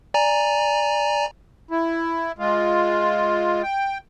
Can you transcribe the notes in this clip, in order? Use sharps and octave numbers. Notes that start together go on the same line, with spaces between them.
D5 G#5 A#5
E4
G#3 F4
G5